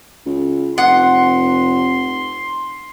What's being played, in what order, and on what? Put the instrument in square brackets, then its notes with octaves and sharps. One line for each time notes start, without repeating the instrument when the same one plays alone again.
[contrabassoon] C#2
[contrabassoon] F1 [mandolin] F#5 [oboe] C6